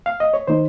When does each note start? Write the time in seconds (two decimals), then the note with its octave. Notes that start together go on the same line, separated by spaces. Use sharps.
0.06 F5
0.20 D#5
0.34 C#5
0.47 D#3 A#3 D#4 C5